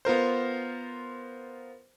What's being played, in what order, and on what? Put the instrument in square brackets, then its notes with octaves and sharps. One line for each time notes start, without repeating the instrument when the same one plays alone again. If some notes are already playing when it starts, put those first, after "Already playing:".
[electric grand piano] B3 F4 A#4 C5